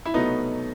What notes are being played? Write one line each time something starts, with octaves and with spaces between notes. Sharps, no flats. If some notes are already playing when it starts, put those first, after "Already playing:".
E4
C2 B2 F#3 A3 B3 D#4